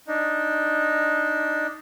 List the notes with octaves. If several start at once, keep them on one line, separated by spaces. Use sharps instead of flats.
D4 D#4